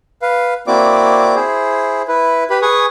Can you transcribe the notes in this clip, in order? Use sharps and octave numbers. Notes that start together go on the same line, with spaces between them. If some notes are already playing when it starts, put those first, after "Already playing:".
B4 F5
A#3 C4 E4 F#4 D5 D6
E4 G#4 C5
E4 B4
G4 B4 B5
G#4 B4 G#5 C#6 D#6